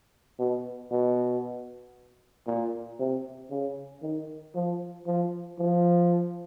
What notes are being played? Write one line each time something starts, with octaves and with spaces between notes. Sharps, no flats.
B2
B2
A#2
C3
C#3
D#3
F3
F3
F3